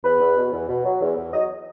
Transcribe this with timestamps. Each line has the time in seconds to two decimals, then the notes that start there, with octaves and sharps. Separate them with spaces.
0.04 E2 B4
0.20 E2
0.37 B2
0.53 E2
0.69 B2
0.85 F#3
1.01 E2
1.17 E2
1.33 F#3 D#5